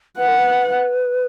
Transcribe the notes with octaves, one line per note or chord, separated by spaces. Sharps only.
B4 F#5
A#4
B4